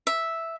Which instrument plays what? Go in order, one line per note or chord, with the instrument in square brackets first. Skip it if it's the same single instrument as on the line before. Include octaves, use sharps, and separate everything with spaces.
[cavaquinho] E5